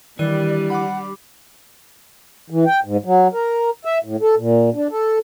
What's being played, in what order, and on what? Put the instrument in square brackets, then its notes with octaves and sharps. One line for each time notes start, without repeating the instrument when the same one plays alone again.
[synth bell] D#3 D#7 [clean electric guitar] E3 [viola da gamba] G3 D4 G4 [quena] D5
[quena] F#5 [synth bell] B5 D6
[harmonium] E3
G5
G#2
F#3
A#4
E5
A2
A4
A#2
D4
A4